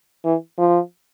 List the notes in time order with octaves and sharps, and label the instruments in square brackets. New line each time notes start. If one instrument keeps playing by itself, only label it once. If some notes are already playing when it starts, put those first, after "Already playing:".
[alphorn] E3
F3